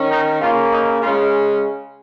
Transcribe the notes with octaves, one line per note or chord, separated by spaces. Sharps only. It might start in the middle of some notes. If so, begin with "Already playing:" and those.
Already playing: D#3 C#4
D#4
C#3 A#3 C#4 F4
D#4
C#3 G#3 C#4 F4